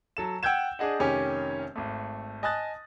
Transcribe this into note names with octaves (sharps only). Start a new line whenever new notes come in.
F#3 A4 E7
F#5 G5 E6 G6 G#6 E7
D4 G#4 D#5 F#5
F1 D#3 C#4 G4 G#5
G#1 A3
D#5 G#5 A5 D#6 F#6 A6